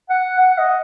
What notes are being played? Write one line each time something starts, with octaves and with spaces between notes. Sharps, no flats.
F#5
F#5
D#5